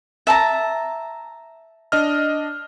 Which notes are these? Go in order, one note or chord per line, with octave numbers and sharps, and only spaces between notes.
E5 A5 A#5
D4 D#5 F6